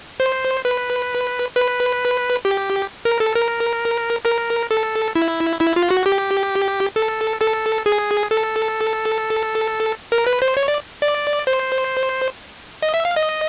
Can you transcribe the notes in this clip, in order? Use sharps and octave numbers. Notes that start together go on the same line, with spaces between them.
C5
B4
B4
G4
A#4
A4
A#4
A#4
A4
E4
E4
F4
F#4
G4
A4
A4
G#4
A4
A#4
B4
C5
C#5
D5
D5
C5
D#5
E5
F5
D#5